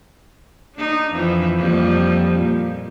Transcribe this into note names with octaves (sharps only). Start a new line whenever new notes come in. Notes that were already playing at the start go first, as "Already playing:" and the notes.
D4 D#4
F2 E3
F2 G3 A#3
A#2